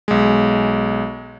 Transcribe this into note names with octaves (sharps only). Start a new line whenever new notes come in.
B1 G#3